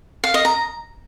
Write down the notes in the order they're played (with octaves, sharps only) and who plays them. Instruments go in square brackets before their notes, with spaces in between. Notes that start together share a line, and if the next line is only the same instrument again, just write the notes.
[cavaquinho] F5
D#5
A#5